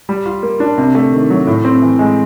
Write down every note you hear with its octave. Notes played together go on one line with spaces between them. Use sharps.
G3
F4
A#3
D4
C3
A3
D#3
F#3
A2
C4
E3
G#3